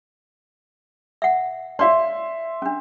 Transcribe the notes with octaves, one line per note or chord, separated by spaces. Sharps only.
E5 F#5
C#5 D5 E5 F5 C6
C#4 D4